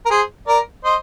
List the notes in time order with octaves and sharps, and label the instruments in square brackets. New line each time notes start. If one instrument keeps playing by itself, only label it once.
[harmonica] A#4
G#4 C5
A#4 D5
C5 D#5